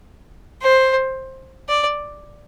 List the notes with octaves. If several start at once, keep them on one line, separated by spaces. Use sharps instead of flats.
C5
D5